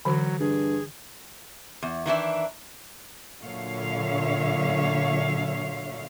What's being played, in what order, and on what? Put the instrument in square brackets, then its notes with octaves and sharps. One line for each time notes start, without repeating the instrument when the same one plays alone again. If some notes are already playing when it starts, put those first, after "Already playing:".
[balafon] D3 E3 F#4 [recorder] F#3
[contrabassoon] G2 [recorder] G#4
[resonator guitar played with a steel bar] E2
D#3 E3 D4 E4
[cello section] A#2 D3 F#3 C#5 E5 F5